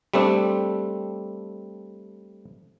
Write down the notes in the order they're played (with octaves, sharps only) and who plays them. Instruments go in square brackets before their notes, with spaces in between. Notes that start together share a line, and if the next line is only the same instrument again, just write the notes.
[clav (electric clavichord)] G3 A3 C4 D4